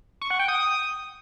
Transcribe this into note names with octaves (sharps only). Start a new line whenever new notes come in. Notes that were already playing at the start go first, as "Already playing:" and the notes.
C#6
F#5
G5
D#6